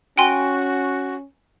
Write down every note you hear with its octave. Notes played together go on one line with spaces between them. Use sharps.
C#4 F#4 G5 G#5 C6